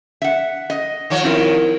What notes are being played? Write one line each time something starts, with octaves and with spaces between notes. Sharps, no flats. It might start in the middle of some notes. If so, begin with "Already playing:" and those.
E5 F#5
D#5
D#3 F3 C#5
C4 E4 A#4